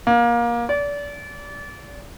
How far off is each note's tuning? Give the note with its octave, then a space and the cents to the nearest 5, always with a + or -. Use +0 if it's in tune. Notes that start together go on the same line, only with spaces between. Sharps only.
A#3 +25
D5 -30